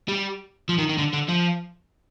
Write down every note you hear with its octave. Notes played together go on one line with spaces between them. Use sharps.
G3
F3
D#3
D#3
D3
D3
F3